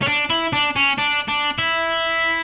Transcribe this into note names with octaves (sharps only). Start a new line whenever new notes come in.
C#4
D4
E4
D4
C#4
D4
D4
E4